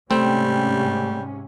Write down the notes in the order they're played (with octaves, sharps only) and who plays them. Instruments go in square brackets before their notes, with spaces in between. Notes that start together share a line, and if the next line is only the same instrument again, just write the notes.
[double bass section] G#2 C3 C#4 [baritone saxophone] G3 [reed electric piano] A3 [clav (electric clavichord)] C4